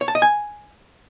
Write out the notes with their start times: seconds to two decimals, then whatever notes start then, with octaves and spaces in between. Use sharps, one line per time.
0.01 C#5
0.08 A5
0.15 D#5
0.22 G#5